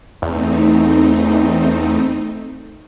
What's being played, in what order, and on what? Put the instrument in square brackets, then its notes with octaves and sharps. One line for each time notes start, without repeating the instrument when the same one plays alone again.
[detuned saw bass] E2 [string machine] A3 C4 D#4